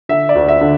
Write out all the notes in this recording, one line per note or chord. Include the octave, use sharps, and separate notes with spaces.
D3 E5
D5
D2
E5
D3